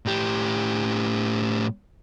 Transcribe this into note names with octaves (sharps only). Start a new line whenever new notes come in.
A2 G4